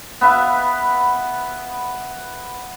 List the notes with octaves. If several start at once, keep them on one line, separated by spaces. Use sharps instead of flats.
B3 B4 E5 F5